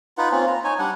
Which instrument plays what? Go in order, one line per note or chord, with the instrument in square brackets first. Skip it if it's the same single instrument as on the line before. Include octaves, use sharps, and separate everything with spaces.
[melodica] D#4 F4 B4 F#5
A#3 C4 C#4 F4
A#5
D#4 C#5 G#5
G3 D4 F#5